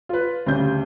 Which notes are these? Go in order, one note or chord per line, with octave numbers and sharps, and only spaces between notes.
F4 B4
D2 C#3 G3 G6